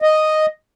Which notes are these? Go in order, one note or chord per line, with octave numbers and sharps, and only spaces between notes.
D#5